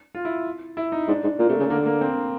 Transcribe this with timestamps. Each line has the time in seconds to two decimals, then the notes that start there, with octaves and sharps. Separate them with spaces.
0.15 F4
0.25 E4
0.77 E4
0.92 D#4
1.08 G#2 D4
1.23 G#2
1.39 A#2 A#3
1.49 C3 A3
1.60 C#3 A3
1.70 D3 A#3
1.86 A#3
2.01 C4